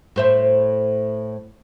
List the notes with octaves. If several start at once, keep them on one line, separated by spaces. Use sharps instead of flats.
A2 C5 E5